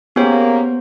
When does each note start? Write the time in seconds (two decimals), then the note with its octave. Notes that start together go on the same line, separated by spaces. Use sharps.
0.16 A#3 B3 C#4 G4 G#4 C5